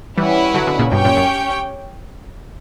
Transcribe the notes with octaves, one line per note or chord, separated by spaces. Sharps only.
E3 G3 C#4 E4 B4 F#5
D3 F#3
B2 D3
A#2 C#3
G2 B2 C#4 G4 C#5 G5
F#2 A#2
F#2